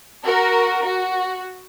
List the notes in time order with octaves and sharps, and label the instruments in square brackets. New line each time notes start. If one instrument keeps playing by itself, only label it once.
[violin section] F#4 A#4
F#4